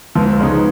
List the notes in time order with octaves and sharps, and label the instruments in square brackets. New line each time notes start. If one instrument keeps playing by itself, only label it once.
[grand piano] C#2 [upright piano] F3
[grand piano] C#3 G#3 B3 D#4